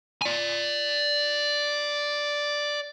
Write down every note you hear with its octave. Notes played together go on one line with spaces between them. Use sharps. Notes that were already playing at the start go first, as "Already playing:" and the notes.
D5 G#5